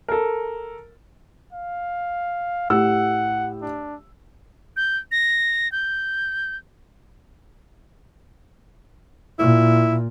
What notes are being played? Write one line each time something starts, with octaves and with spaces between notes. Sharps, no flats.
A4 A#4
F5
A2 G4 F#5 E6
D4
G6
A#6
G6
A#2 E4